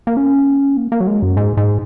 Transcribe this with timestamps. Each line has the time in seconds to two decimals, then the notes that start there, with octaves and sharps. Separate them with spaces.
0.07 A#3
0.17 C#4
0.77 A#3
0.92 A#3
1.00 F#3
1.07 G#3
1.22 F#2
1.37 G#2
1.57 G#2